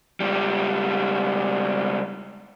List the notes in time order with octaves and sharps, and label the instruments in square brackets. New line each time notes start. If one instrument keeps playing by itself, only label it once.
[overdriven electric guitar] C#2 G3